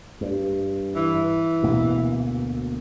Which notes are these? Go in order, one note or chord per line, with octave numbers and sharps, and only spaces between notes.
G2
E3
D2 B2 A#3